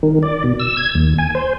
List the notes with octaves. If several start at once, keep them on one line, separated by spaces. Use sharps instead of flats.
D#3
D5
B2
E6
G#6
D#2
G#5
C5